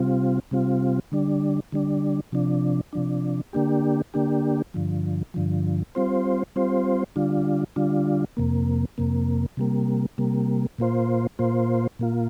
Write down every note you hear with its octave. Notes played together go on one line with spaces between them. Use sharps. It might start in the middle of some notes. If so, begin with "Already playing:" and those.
Already playing: C3 G3 C4 F4
C3 G3 C4 F4
D3 G3 D4
D3 G3 D4
C3 F3 D4
C3 F3 D4
D3 A#3 D4 G4
D3 A#3 D4 G4
G2 D3 F3
G2 D3 F3
G3 C4 F4 C5
G3 C4 F4 C5
D3 G3 D4 F4
D3 G3 D4 F4
F2 C3 A#3
F2 C3 A#3
C3 G3 A#3
C3 G3 A#3
A#2 A#3 F4 C5
A#2 A#3 F4 C5
A#2 A#3 F4